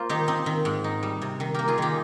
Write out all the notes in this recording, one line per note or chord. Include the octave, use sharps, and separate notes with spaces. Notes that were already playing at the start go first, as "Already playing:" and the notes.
Already playing: A#3 F4 C5
D#3 D#4 G4
C4 D#4
D#3
G#2
D#4
G3
C3
D#3
A#3 G4 A#4
F4 G#4
D#3 D#4 G4